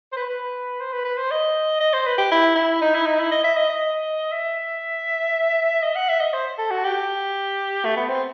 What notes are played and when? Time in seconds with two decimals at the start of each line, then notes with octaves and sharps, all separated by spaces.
0.12 C5
0.17 B4
0.30 B4
0.80 C5
0.93 B4
1.05 B4
1.17 C5
1.31 D#5
1.81 D#5
1.93 C5
2.07 B4
2.18 G4
2.32 E4
2.56 E4
2.82 D#4
2.95 E4
3.06 D#4
3.20 E4
3.32 D#5
3.44 E5
3.57 D#5
3.70 D#5
4.32 E5
5.83 D#5
5.95 F#5
6.09 E5
6.21 D#5
6.33 C5
6.58 A4
6.71 F#4
6.84 G4
7.85 A3
7.97 B3
8.09 C4